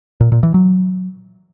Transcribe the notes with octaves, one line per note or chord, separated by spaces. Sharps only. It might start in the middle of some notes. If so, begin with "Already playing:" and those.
A#2
A#2
E3
F#3